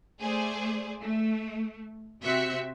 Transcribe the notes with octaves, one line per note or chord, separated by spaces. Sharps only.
A3 G#4 C5 D5
A3
C3 C4 F#4 E5 C#7